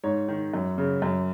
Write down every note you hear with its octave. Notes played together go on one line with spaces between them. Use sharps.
G#2 C#5
D#3
F#2
C#3
F#2